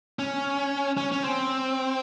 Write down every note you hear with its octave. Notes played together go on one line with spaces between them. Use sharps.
C#4
C#4
C#4
C4